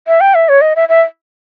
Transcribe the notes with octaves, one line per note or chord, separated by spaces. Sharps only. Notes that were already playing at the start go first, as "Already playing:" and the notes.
E5
G5
E5
C#5
D#5
E5
E5